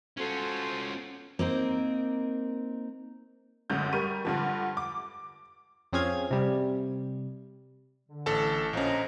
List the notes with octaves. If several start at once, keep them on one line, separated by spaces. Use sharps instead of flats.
C#4 F4 F#4 A4 C5
A#3 C4 D#4 A#4
A1 F#2 D3 G6
G3 A#4 C#6 D#7
G2 D3 F3
D6
F2 C4 C#4 G#4 F5 G#6
C3 G3
D3
A1 A4 A5
A#1 F3 C#4 D#5 A#5